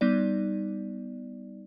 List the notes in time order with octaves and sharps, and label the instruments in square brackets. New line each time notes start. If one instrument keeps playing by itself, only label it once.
[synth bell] G3 B3 D#4 D5